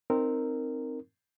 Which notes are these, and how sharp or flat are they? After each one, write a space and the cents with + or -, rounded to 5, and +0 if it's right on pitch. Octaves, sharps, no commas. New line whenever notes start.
C4 +0 D#4 -10 A#4 -10